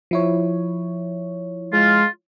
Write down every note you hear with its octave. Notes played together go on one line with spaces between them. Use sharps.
F3 E4 C#5
G#3 F4